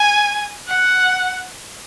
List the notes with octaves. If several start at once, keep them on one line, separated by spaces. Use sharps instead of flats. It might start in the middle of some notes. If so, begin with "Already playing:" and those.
Already playing: G#5
F#5